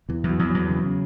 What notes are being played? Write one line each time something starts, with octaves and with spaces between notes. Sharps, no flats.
E2 E3
E2
F#3
E2
F#3
E2
C#3
C#3